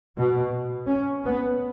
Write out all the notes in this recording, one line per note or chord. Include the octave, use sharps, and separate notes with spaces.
B2
C#4
B3